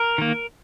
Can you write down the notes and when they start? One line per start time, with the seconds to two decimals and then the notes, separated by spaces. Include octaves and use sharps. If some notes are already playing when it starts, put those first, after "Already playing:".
Already playing: A#4
0.18 D#3 A#3